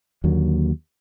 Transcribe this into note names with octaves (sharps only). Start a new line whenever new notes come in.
D#2 D3 F#3 A#3